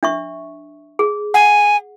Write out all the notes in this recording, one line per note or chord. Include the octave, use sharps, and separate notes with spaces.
D4 E5 C#6
G#4
F#5 G#5